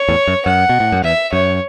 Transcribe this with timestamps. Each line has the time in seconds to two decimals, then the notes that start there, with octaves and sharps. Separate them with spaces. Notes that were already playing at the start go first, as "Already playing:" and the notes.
Already playing: C#5
0.09 E2 A2
0.28 F#2
0.46 F#2 F#5
0.69 B2
0.80 A2
0.92 F#2
1.04 E2 E5
1.33 F#2 C#5